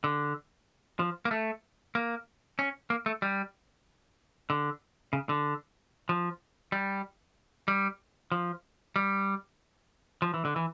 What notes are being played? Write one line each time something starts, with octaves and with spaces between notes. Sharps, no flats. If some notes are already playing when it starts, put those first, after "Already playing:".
D3
F3
A#3
A3
A#3
C#4
A#3
A3
G3
D3
C#3
D3
F3
G3
G3
F3
G3
F3
E3
D3
E3